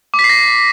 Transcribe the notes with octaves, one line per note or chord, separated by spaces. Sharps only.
D6
B6
C7
A#6